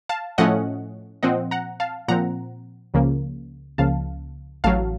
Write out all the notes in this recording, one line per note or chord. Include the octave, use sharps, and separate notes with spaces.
F5 A5
A2 F3 A3 C#4 D#5 F#5
A#2 F3 C4 D#5 F#5
F#5 A#5
F5 A5
A#2 F3 C4 F#5 A#5
C#2 C#3 F3 A#3
C#2 C#3 F3 A#3 F5 A5
A1 A2 F#3 F5 A5